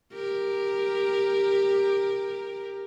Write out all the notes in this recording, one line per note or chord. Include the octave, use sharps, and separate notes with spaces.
G4 A#4